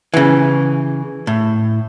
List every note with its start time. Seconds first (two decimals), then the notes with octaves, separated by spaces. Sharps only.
0.14 C#3 E3
1.27 A2